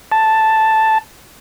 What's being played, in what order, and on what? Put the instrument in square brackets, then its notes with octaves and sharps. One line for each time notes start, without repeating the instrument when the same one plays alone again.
[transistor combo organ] A5